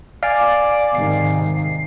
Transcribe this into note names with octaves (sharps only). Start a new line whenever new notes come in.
D5 F5 G#5
G#2 C3 D#3 C7